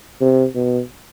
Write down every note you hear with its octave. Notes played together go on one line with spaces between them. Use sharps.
C3
B2